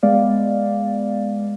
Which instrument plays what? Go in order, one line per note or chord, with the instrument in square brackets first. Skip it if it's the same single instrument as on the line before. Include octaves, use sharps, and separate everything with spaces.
[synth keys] G#3 B3 D5 F5